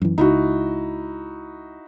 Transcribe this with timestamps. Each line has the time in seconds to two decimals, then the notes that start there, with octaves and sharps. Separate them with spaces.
0.02 F#2 E3
0.18 C#2 D#4 E4 F#4